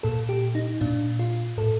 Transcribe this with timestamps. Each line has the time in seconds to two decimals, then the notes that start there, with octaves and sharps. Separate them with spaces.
0.03 A#2 A4
0.29 G4
0.55 D#4
0.81 A#2 D4
1.19 F4
1.58 A2 A4